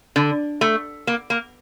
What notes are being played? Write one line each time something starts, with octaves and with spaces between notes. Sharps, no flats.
D3
A3
A#3
A#3